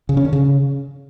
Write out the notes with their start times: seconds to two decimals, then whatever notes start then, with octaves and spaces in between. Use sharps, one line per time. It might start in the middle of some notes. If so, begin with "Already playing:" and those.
0.09 C#3
0.17 C#4
0.25 D3
0.33 C#3